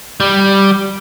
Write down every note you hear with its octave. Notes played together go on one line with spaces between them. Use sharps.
G3